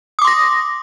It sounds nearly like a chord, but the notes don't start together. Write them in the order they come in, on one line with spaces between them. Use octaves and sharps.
D#6 D6 C6 A#6